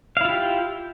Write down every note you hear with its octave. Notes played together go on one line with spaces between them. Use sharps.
E4 F4 G4 F5